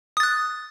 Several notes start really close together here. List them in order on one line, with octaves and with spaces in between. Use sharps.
D#6 A6 F#6